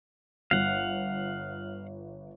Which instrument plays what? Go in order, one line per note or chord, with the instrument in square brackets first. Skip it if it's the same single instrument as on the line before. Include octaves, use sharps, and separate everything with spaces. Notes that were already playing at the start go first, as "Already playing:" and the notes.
[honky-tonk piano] G1 [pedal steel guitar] F5 F#5